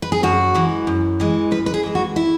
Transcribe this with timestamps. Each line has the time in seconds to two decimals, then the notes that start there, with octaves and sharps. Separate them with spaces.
0.02 B4
0.12 G#4
0.23 F#2 F#4
0.54 E3 G#3
0.87 F#2
1.20 E3 G#3
1.51 F#2 B4
1.66 B4
1.74 G#4
1.83 E3 G#3
1.95 F#4
2.16 E4